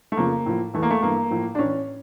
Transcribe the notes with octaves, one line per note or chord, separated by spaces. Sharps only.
A3
F2 C#3 F3 A#3
A2 F3
E2 E3 A3
A#3
A3
G2 E3 A#3
A2 F3
D4
A2 E3 C#4